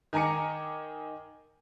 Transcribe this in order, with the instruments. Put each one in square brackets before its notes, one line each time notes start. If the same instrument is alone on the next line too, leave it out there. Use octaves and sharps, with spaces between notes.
[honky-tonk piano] D#3 G#5 A#5 D6 C#7